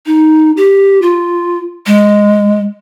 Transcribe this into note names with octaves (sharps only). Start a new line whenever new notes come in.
D#4
G4
F4
G#3